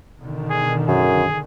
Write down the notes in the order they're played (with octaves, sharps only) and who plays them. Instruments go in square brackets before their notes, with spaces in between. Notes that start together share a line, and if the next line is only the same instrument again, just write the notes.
[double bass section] B2 D3 D#3
[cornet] G#4
[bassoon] F#2 [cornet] G#4